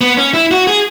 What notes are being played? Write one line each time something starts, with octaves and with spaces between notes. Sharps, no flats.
B3
C#4
E4
F#4
G#4